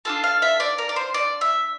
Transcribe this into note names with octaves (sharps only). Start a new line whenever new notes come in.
D4 F4 A4 A5
F5
E5
D5
A#4
D5
C5
D5
E5